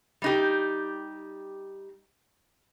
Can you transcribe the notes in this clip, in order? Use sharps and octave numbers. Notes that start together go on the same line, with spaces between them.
G3 D#4 G4